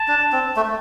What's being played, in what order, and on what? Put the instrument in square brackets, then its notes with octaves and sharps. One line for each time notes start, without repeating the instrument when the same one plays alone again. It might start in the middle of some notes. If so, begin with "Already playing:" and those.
Already playing: [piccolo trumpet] A5
[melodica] D4
C4
A3